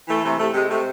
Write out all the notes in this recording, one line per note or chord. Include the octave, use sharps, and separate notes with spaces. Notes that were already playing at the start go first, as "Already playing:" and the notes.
E3 A3
C3 A3
C3 A3
C3 G#3
C3 A3